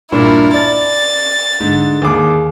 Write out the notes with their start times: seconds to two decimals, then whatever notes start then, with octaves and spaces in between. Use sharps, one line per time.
0.12 G2 A#2 D4 E4 A#4
0.54 D5 A5 A6
1.60 G#2 D3
2.02 D#2 G#4 D6